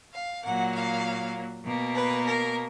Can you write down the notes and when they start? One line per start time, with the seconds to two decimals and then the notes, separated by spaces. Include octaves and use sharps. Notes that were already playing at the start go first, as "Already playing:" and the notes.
0.14 F5
0.45 A#2 F#3 A#3 F#5
0.75 F5
1.65 B2 A#3
1.95 B4
2.26 A#4